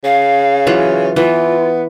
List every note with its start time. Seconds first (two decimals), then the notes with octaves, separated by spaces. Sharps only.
0.04 C#3 F5
0.67 E3 F#3 F4
1.16 E3 B3 F4